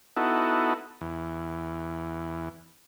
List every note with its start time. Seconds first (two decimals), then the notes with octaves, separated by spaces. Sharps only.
0.17 B3 D#4 E4 F#4 A4
1.01 E2